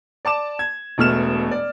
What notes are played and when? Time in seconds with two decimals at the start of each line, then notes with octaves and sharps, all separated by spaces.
0.25 D5 A5 D6 E7
0.59 G#6
0.98 E1 B2 A3 F6 E7
1.51 D5